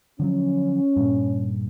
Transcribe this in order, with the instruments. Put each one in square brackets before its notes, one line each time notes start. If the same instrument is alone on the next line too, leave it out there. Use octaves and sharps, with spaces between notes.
[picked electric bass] D3 F3 F#3 [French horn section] C#4
[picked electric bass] G2 A#2